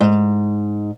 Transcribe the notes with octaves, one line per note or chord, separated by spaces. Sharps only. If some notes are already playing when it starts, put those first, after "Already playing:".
G#2